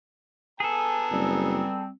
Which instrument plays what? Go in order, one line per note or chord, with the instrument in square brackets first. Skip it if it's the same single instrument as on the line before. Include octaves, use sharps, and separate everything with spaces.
[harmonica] B3 G#5 A#5 [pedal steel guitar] G#4 A4
[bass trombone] F#1 [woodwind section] G3 C4